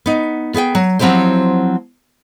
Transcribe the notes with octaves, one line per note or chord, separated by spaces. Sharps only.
B3 D#4
B3 G#4 F5 G5
F#3
F3 F#3 C4 E4 G4 C5